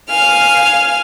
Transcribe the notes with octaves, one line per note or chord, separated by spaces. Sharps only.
F5 G#5 F6